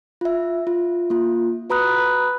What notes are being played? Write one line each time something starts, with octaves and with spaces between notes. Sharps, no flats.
F4 E5
F4
A#3 F4
F#4 B4 A#5 B5 D#6 F#6